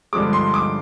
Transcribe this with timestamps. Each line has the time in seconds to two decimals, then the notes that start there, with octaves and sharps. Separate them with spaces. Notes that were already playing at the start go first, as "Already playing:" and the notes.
0.13 G2 D3 F3 G#3 D6
0.33 C6
0.54 D6